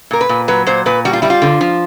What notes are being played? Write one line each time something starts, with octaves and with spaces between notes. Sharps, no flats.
A#2 A#4
B4
A#2
F#3 B4
A#2 C5
A#2 B4
G3 F#4
F4
G3 E4
F4
D3
F3